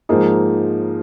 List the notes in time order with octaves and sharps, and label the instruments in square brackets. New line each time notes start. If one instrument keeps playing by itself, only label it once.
[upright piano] G#2 F3 A#3 D#4 G#4